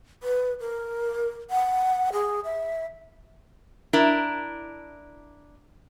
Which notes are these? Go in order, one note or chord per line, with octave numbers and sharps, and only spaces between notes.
B4
A#4
F#5
G#4
E5
D4 E4 A#4